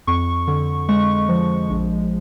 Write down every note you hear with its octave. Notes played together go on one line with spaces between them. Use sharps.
F2 C#6
D3
G#3 C#6
F3
A#1